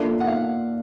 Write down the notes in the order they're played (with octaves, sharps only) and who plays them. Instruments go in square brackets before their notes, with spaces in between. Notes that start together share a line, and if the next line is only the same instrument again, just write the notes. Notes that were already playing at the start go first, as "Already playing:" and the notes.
Already playing: [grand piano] A#3 D4 F4 A4 D5 [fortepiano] E5
[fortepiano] F#5
F5